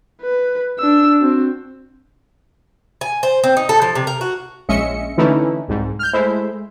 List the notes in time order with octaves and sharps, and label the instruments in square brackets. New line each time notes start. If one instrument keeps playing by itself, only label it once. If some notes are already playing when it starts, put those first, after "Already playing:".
[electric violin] B4
D4 E6
C4 F#4
[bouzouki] G#5
C5
C4
D#4
A4
F3
C3
A#4
F#4
[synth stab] A#1 G#3 C#4 D#5 E5 C#7
D3 E3 A3 C#4 D#4 E4
C2 G#2
F6 G6
G#3 A3 E4 C5 E5